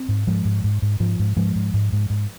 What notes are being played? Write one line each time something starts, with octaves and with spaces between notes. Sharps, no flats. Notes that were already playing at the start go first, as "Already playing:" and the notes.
Already playing: C4
G#2
G#2 F3 G#3
G#2
G#2
G#2
G#2 F3
G#2
G#2 F3 G#3
G#2
G#2
G#2
G#2